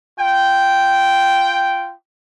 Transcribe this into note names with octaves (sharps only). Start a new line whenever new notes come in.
F4 G5